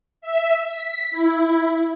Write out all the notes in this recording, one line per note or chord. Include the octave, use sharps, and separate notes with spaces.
E5
B6
E4